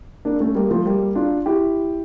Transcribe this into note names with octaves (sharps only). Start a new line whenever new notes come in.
A#3 D4
A3 C#4
G3 A#3
F3 A3
G3 A#3
D4 F4
E4 G4